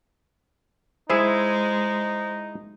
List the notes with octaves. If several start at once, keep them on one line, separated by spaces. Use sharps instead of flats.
G#3 D#4 E4 G#4 C5 E5